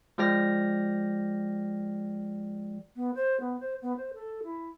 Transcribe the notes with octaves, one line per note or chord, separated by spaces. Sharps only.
F3 G#3 D5 G5 F6 A#6
B3
C5
B3
C5
B3
C5
A4
E4